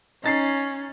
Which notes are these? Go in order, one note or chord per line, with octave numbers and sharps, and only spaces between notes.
C#4 D#4 A6 C7